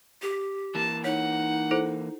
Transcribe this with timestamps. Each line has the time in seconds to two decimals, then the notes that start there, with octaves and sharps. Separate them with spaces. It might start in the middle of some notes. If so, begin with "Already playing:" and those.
0.22 G4
0.75 E3 A#3 A5
1.04 D#4 C#5 F#5
1.71 E4 A4 C5